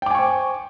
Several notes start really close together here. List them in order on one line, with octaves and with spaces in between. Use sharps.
G5 D6 G#5 C#6 C5